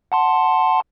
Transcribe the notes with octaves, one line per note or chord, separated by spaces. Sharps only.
F#5 A5 C6